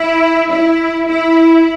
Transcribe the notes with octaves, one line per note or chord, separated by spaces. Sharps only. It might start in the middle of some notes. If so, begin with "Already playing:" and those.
Already playing: E4
E4
E4